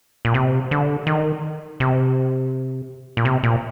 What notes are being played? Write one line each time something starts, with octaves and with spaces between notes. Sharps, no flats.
A#2
C3
D3
D#3
C3
A#2
C3
A#2